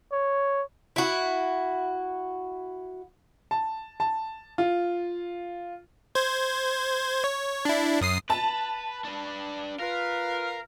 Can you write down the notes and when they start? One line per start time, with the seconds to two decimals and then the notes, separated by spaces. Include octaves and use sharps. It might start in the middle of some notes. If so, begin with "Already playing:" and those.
0.12 C#5
0.96 E4 F#4
3.51 A5
4.00 A5
4.58 F4
6.15 C5 G#6
7.24 C#5
7.65 D4 E4
8.01 F#2 D#6 C7
8.30 B4 A5
9.04 D4 B4
9.80 F4 A#4 B4 F5